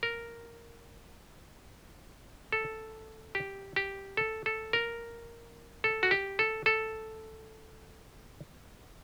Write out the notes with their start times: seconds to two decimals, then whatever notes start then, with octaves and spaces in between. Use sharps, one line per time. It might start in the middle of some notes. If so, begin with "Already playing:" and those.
0.03 A#4
2.52 A4
3.35 G4
3.76 G4
4.17 A4
4.46 A4
4.73 A#4
5.84 A4
6.03 F#4
6.11 G4
6.39 A4
6.66 A4